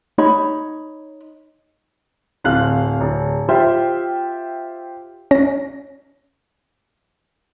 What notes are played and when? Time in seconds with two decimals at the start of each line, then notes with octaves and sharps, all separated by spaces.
0.18 D#4 C#5 B5
2.44 D1 C4 F5 F#6
3.01 D1
3.49 F4 G4 C5 E5 G5
5.31 C#4 A#6